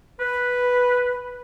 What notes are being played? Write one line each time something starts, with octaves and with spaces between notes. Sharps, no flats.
B4